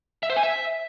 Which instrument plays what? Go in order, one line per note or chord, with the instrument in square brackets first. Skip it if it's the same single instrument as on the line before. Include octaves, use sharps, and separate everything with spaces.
[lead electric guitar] E5
C5
G#5
E5